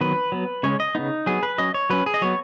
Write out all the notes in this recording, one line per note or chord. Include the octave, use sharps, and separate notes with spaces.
D#3 F#3 B3 B4
F#3 B3
C#3 G#3 C#4 C#5
D#5
C#3 B3 D#4
F#3 B3 G#4
B4
F#3 C#4 D#5
C#5
F#3 C#4 B4
G#4
D#5
F#3 B3 C#5